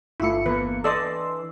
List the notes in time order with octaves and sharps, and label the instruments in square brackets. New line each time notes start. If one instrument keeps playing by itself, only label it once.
[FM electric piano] G1 F4 C#7 [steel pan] A3 E4
[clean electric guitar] E2 A#3 [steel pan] B4
[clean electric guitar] E3 D4 [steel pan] A4 D5 D#5 [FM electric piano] C6 E6